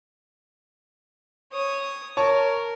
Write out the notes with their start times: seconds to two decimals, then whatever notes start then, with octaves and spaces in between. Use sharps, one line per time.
1.52 C#5 D#6
2.17 A#4 C#5 A5 C#6